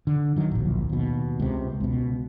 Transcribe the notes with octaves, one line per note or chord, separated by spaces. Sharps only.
D3
D#3 F#3
D1 A#1
D#2 B2
C#2 C3
C#2 B2